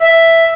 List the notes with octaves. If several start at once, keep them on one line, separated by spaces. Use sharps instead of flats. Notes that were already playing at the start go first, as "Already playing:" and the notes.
E5